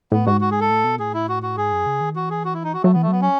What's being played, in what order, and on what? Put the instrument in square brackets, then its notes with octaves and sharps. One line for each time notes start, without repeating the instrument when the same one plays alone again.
[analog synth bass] A2 [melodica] B3
[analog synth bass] G#2 [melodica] F#4
[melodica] F#4
G#4
A4
[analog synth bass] A2
B2
[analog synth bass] A2 [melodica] G#4
[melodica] E4
F#4
F#4
[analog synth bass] G#2 [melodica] G#4
[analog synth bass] F#2
C#3
D#3
[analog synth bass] E3 [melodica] F#4
[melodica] G#4
F#4
E4
D#4
F#4
[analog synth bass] F#3 [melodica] A3
[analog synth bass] E3 [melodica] B3
[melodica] A3
[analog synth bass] F#3 [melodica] B3
[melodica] C#4